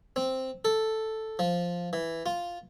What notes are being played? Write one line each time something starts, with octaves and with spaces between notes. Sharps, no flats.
C4
A4
F3
E3
F4